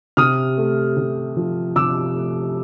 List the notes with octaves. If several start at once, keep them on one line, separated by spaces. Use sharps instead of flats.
C3 D#6 F6
A3
C3
F3
C3 D6 E6
A3